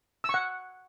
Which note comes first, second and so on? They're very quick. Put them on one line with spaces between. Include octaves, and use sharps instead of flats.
E6 C#6 F#5